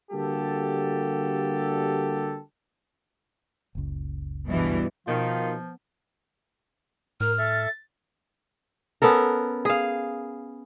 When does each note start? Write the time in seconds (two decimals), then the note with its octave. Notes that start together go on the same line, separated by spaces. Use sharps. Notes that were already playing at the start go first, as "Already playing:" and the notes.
0.11 D3 G3 A#3 F#4 G4 A4
3.75 F#1 C#2
4.48 G2 B2 E3
5.07 B2 D#3 F3 F4
7.20 A2 A#4 F6
7.38 A4 E5 A6
9.02 B3 C#4 A4 A#4
9.65 G#4 F5